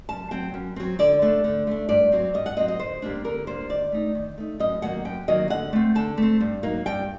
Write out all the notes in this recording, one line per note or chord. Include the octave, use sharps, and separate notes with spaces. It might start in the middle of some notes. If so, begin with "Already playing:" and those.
F#2 A5
F#3 C4 G5
F#2
F#3 C4
D3 D5
A3 D4
D3
A3 D4
G2 D5
F#3 C4
G2 D#5
F#5
F#3 C4 D#5
D#5
D3 C5
G3 A#3 D4
D3 A#4
G3 A#3 D4 C5
D#3 D5
A3 D#4
D#3
A3 D#4
F#2 D#5
D#3 F#3 A#3 F#5
F#2 G5
D#3 F#3 A#3 D#5
D3 F#5
A3 C4
D3 A5
A3
C4
G2
F#3 A#3 D#4
G2 G5